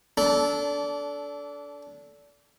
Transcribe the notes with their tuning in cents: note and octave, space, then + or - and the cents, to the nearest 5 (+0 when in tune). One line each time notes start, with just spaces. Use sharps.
D4 -25 A4 -10